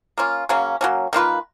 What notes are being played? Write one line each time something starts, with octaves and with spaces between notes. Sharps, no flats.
A#3 C#4 F4
C#3 F#3 A#3 C#4
F#3 A#3 C#4
D#3 A#3 F4 B4